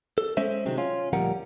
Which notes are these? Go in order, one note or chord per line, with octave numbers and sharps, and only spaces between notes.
A4
G#3 C#4 C5 E5
C3 D#3 F#3 G#3 C4
C#4 F4
D2 A#2 F3 G3 A#4 F#5